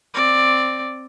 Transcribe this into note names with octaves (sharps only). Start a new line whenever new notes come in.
C4 D5